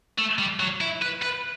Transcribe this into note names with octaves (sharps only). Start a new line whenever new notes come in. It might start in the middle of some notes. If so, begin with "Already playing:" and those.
A3
G3
F#3
E4
B4
B4